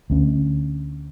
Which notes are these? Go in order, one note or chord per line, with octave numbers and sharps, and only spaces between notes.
D2 C#4